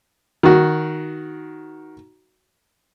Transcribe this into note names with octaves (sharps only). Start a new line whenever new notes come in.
D#3 F#4